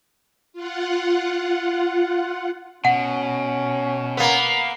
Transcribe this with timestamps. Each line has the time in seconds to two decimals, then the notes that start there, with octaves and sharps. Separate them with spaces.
0.53 F4 F#5
2.85 B2 C#4 F#5
4.17 A#3 B3